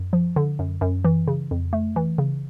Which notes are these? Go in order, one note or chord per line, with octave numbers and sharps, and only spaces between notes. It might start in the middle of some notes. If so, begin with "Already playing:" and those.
Already playing: F#2
F3
D3
F#2
F#2
E3
C#3
F2
A3
E3
C#3